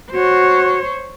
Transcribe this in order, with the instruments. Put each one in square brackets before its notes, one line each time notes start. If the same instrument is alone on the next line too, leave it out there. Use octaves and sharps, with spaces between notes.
[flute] F#4 [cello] C5 C#5